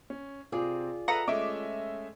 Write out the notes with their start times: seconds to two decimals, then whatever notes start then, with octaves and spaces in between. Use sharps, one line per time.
0.10 C#4
0.52 C3 C4 F4 G#4 D5
1.08 A4 B4 E5 F#5 A#5 D#6
1.28 G#3 A3 C#4 D#5 E5 D6